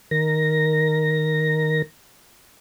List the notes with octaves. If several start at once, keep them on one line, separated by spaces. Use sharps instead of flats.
D#3 A#4 A#6